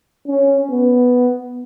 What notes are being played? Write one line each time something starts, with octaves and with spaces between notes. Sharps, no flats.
C#4
B3